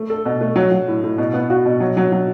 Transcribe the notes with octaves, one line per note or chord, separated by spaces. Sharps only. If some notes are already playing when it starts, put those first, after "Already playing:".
Already playing: A3
A4
B2
A3
F#3
F#3
A2
A2
B2
B3
F#4
B2
F#3
F#3
F#3